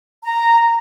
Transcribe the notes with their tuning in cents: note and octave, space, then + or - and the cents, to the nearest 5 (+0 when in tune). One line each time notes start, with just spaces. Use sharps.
A#5 -10